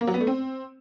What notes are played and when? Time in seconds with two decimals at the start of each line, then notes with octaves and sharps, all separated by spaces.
0.01 A#3
0.07 F#3
0.14 B3
0.20 A3
0.27 C4